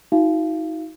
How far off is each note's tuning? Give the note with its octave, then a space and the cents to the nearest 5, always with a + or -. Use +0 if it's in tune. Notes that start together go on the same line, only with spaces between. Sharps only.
D#4 +40 F#4 -15 F5 -30